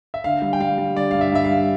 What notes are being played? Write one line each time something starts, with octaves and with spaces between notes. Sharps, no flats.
E5
D3 F5
G3
G5
G3 F5
G3
D3 D5
G2 F5
E5
G2 E5
F5
G2